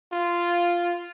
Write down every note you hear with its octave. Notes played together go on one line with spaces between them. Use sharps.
F4